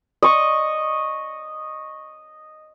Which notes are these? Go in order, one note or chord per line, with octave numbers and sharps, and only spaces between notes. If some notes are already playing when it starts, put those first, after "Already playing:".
D#5 C#6